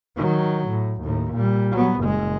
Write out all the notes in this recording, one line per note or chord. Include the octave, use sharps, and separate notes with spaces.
D#3 F#3
A2
D#2 A2
A#2 G3
F#3 B3
F#1 G#3